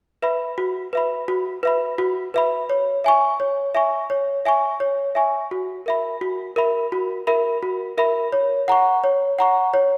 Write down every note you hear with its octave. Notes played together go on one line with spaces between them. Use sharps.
B4 E5 B5
F#4
B4 E5 B5
F#4
B4 E5 B5
F#4
B4 E5 B5
C#5
E5 G#5 C#6
C#5
E5 G#5 C#6
C#5
E5 G#5 C#6
C#5
E5 G#5 C#6
F#4
A#4 E5 B5
F#4
A#4 E5 B5
F#4
A#4 E5 B5
F#4
A#4 E5 B5
C#5
F#5 A#5 C#6
C#5
F#5 A#5 C#6
C#5